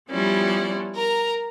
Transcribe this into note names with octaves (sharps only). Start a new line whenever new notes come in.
F3 G3 B3 C#4 E4 D5
A#4 A#5